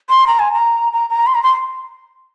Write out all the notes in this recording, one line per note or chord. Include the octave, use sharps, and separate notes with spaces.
C6
A#5
G#5
A#5
A#5
A#5
C6
A#5
C6